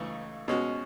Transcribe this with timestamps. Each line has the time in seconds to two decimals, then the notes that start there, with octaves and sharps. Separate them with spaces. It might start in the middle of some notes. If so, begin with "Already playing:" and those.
Already playing: C#2 C#3 E3 A3 D#4
0.48 B2 G#3 C#4 F#4